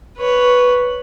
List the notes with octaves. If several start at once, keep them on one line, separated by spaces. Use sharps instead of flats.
B4 C#5